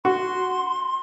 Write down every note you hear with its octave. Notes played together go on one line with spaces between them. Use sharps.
F#4 C6